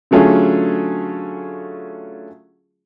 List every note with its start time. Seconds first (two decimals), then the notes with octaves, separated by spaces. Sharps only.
0.11 D3 F#3 A3 C#4 F4 G#4